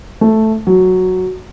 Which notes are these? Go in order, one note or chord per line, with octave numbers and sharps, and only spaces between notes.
A3
F#3